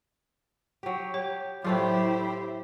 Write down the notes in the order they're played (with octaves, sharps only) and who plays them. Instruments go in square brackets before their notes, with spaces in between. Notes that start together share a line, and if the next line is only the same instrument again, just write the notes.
[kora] F#3 G4
[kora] G4 [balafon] C#5
[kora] A2 A3 F4 [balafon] F#3 [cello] E4 [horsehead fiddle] G4 C5